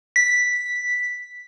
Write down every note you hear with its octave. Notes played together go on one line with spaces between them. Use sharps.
B6